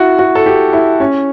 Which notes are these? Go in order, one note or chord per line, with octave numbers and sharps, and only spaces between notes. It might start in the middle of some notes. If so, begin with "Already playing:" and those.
Already playing: E4 F#4
F#4
A4
G4
E4
C#4